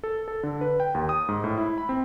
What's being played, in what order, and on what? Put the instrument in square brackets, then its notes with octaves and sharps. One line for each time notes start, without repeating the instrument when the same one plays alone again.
[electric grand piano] A4
A4
D3
B4
G5
D#2
D#6
G#2
A2
E4
B5
C4